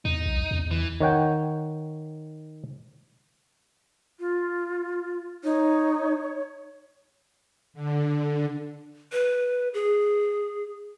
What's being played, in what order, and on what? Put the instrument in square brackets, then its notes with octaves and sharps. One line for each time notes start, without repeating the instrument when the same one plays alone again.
[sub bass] E2 [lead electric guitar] D#4
[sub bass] B1
E2
[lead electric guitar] E3
[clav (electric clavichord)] D#3 C#5 F#5 G5
[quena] F4
[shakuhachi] D#4 [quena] C#5
[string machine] D3
[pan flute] B4
G#4